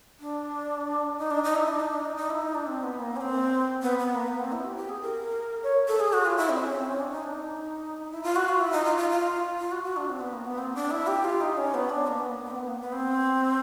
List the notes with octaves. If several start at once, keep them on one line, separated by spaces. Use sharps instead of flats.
D4
D#4
D4
D#4
E4
D4
D#4
D4
D#4
D#4
E4
D#4
D4
C4
B3
A#3
C#4
C4
B3
B3
A#3
B3
C4
E4
G4
G4
G#4
A#4
C#5
A4
G#4
F#4
F4
E4
C4
C#4
C4
C#4
D4
D#4
D4
D#4
E4
F4
F#4
F4
E4
D#4
F4
F4
F4
F4
F#4
F#4
D4
C4
B3
A#3
B3
C4
D4
E4
G4
F4
D#4
C#4
B3
D4
A#3
B3
A#3
A#3
C4
B3
A#3
B3
C4